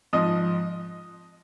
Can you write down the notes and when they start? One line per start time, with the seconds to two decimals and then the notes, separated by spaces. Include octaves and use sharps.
0.13 G#2 F3 D#5 D#6